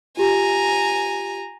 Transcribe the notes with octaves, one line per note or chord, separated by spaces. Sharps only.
F4 G4 G#5 A#5